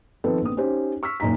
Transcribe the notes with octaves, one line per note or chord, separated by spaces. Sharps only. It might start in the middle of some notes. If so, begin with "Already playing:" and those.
D#3 F3 B3 C4 A4 B4
A#1 B3 C4 D#6
C#4 D#4 G4 C5
C#6 E6 F6 B6
F#1 A#2 D#4 A#5 B6